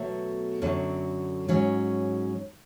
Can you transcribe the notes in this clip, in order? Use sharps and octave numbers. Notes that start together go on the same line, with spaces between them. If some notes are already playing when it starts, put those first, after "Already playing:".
Already playing: B2 F#3 A3
F#2 D3 F#3
G#2 F#3 C#4